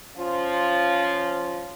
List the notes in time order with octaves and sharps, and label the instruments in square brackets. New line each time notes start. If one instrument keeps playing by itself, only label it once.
[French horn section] F3 C#4 F4